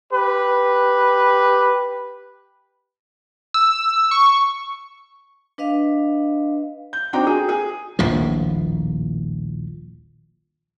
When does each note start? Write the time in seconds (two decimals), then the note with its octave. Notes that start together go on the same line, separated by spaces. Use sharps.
0.11 G4 B4
3.54 E6
4.11 C#6
5.58 D4 B4 D#5 F5
6.93 G6
7.13 C4 D4 D#4 F#4 G5 A#5
7.27 G#4
7.49 G#4
7.99 D#1 A#1 A2 F3